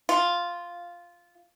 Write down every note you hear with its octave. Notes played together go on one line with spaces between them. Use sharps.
F4